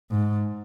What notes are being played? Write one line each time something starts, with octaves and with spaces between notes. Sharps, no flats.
G#2